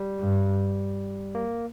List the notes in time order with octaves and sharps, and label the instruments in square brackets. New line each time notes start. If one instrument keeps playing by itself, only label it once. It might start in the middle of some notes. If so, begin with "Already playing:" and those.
Already playing: [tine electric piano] G3
[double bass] G2
[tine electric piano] A#3